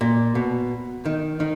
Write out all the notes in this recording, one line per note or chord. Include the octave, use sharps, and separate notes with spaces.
A#2
B2
D#3
D#3